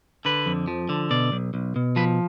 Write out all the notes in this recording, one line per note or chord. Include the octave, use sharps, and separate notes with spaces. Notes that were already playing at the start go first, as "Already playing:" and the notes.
D3 B4
F2
F3
D3
B2 D5
B1
B1
B2
F3 B4